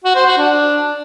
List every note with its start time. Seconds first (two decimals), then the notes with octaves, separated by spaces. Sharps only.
0.04 F#4
0.15 C5
0.26 F#4
0.38 D4